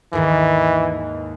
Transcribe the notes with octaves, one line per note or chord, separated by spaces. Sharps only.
D#2 G#2 D#3 E3